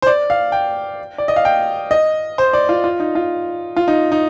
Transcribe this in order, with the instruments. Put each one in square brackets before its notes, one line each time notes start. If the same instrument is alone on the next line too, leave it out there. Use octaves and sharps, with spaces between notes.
[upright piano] C5
D5
F5
G5
D5
D#5
F5
G5
D#5
C5
D5
F4
F4
D#4
F4
F4
D#4
D#4